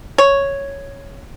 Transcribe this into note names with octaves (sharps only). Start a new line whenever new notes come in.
C#5